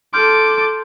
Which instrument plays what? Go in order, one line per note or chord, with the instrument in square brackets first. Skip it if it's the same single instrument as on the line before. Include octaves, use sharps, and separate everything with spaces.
[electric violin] A4 D6 [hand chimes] C6 F6 G6